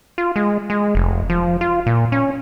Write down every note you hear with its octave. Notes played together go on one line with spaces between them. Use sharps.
F4
G#3
G#3
F1
F3
F4
A#2
C#4